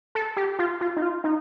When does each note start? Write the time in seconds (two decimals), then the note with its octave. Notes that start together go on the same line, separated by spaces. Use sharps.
0.15 A4
0.37 G4
0.59 F4
0.81 F4
0.97 D#4
1.02 F4
1.24 D#4